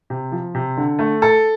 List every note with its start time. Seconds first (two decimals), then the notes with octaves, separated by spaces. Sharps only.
0.10 C3
0.32 F3
0.55 C3
0.77 D3
0.99 A3
1.22 A4